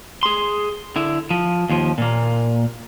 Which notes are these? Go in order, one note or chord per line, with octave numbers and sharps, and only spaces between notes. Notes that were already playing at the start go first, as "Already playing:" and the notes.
G#4 C6
D3 E4
F3
D#2 F3
A#2 A#3